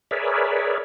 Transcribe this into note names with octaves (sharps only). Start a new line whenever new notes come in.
G#4 A#4 B4 C#5 D5 E5